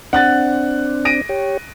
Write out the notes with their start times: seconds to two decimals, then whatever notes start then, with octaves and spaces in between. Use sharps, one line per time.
0.13 C4 D4 F#5 F#6 A6
1.05 A#6 D7 D#7
1.29 G4 C#5